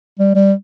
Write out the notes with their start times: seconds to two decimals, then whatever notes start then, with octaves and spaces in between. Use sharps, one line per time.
0.19 G3
0.35 G3